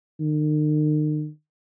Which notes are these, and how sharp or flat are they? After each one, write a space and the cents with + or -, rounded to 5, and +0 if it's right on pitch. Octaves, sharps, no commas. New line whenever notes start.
D#3 -40